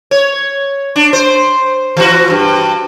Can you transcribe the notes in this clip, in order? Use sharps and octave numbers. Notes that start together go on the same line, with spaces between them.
C#5
D4
C5
E3 F#4
G2